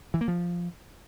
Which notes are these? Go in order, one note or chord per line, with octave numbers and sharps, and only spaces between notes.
E3
A#3
F3